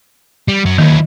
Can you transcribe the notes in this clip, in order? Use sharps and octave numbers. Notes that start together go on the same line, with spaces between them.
G3
F#2 F#3
D#2 D#3 F#3 E4